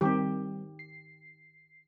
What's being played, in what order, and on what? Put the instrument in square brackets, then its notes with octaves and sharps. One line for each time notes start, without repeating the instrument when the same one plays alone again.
[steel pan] D#3 G4 [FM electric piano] G3 C4
[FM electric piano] C7